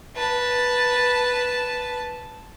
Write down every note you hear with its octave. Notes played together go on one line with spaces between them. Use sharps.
B4 A5